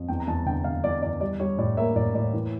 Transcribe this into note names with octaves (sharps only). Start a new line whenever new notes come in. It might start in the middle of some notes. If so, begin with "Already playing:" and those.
Already playing: F2
E2 G5
A#5
E2 A5
D3 G5
D3 F5
E2 D5
E2 D5
G3 D5
G3 C#5
A2 D5
A#3 E5
A2 D5
A2 D5
E3